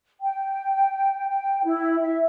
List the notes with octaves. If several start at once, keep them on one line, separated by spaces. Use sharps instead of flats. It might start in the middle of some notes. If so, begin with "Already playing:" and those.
G5
G5
E4
E5